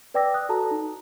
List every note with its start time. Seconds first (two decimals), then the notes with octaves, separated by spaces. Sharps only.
0.14 B4 D5 G5 D6 E6 A#6
0.34 D#6 F#6
0.49 F#4 A4 A5 A#5
0.71 D#4